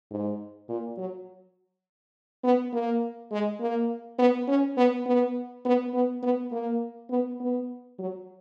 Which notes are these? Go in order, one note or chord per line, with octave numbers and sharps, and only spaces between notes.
G#2
A#2
F#3
B3
A#3
G#3
A#3
B3
C#4
B3
B3
B3
B3
B3
A#3
B3
B3
F#3